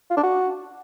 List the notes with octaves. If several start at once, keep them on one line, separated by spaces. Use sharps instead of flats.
F4
D4
F#4